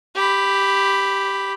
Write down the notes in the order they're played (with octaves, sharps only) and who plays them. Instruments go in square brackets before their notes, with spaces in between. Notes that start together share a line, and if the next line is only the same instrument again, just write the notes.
[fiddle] G4 B5